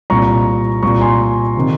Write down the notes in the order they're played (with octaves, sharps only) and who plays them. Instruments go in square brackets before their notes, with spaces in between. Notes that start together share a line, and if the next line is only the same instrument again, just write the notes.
[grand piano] C2 A#2 A#5 C#6
C2 A#2 A#5 C#6
G#5 C6
C3 D#3